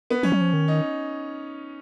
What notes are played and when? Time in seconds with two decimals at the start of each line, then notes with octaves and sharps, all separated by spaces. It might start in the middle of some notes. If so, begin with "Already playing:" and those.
0.10 B3
0.23 F3 C#4
0.32 F#3
0.41 F3
0.53 D#3
0.68 D#4